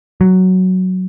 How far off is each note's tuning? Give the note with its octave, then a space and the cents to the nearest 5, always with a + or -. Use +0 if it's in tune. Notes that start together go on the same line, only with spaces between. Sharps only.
F#3 +5